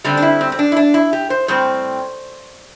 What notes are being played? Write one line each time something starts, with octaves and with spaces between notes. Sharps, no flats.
D3 G3 C4 D4
D4
E4
C4
C4
D4
E4
D4
E4
G4
C5
A2 G3 C4 C5